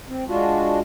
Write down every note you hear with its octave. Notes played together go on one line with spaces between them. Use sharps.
C4
G#3 D4 F4 F#4